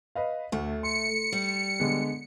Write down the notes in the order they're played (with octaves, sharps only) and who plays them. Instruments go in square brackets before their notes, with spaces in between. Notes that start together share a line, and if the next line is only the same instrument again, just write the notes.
[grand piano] B4 D#5 F5
[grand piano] D2 [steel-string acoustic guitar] A3
[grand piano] C6 [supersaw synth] C#7
[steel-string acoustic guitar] G3
[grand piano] D3 G#3 B3